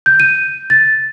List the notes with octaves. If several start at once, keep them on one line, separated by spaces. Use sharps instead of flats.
G6
D#7
A6